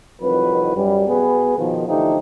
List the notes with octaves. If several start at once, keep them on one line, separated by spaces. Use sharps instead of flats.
C2 F2 D#3 F#3 B4
F#2 G3
B2 B3 G#4 B4
B2 D#3 F3
D3 E3 F3 A3 D#4 G4